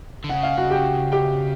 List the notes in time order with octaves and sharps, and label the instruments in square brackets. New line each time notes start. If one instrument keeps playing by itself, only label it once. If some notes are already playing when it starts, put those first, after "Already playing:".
[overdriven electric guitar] D3
[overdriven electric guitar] C#3 [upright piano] F#5
[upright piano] F5
F#4 F#5
G4 G5
G4 G5